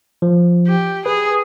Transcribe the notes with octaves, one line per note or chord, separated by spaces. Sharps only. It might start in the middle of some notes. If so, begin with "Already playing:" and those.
F3
G4
G#4 B4